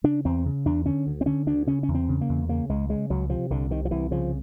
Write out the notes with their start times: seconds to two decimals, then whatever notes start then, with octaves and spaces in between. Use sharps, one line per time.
0.04 C#3 D4
0.25 E2 C4
0.46 C#3
0.66 E2 D4
0.86 D3 C#4
1.07 D2
1.21 C4
1.26 D3 C#4
1.47 D2 D4
1.67 C#3 C#4
1.83 C#4
1.88 E2
1.95 C4
2.09 C#3
2.21 A#3
2.29 E2
2.49 C#3 A#3
2.69 C#2 G#3
2.89 C#3 G#3
3.10 C#2 F#3
3.30 C3 F3
3.50 C2 D3
3.70 C3 D#3
3.85 F3
3.91 C2 E3
4.11 C#3 F3